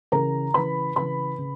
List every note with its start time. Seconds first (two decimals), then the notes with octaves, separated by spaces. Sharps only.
0.12 C#3 E3 A#4 A#5
0.54 C#3 E3 B4 B5
0.96 C#3 E3 B4 B5
1.38 C#3